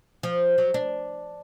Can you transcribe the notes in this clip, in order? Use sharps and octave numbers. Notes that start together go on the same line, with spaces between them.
F3
F#3
D4